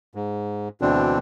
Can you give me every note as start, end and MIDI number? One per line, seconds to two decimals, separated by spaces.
0.15 0.69 44
0.82 1.18 38
0.82 1.18 47
0.82 1.18 50
0.82 1.18 52
0.82 1.18 60
0.82 1.18 62